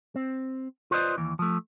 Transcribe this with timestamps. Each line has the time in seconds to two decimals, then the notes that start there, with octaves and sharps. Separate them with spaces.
0.16 C4
0.91 F4 B4 C5 D5 D#5
1.18 D#2 E3
1.39 F3 A3